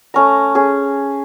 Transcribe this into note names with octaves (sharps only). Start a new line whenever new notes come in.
A3 C#4 A#5
C#4 G#4